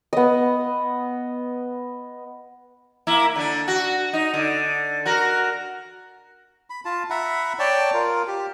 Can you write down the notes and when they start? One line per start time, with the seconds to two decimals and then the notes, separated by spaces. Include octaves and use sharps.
0.13 B3 D#5
3.07 A#3 E4
3.36 D3 D4
3.68 F#4
4.13 D#4
4.34 D3
5.06 F#4 A#4
6.70 B5
6.85 F4 A5
7.10 E5 F#5 A#5 B5
7.59 C#5 D5 G5 A5
7.94 F4 A#4
8.27 G4